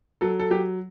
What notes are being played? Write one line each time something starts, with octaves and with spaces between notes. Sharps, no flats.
F#3 A4
A4
F#3 G4